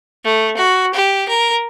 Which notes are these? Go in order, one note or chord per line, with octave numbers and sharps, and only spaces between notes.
A3
F#4
G4
A#4